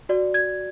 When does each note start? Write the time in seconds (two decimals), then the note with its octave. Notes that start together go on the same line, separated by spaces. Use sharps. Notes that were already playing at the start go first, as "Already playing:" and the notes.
0.09 F#4 D5
0.34 G#6